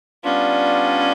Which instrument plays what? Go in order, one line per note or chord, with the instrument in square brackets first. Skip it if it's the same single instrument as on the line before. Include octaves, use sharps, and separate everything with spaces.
[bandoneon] G3 B3 D4 F4 [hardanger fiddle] C#4